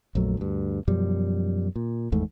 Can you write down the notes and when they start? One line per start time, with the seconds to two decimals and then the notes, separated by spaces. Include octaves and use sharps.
0.15 A#1 F2 F#3 A3
0.37 D2 G2
0.88 F#2 B2 F3 G3
1.76 A#2
2.12 G#1 E2 G#2 A3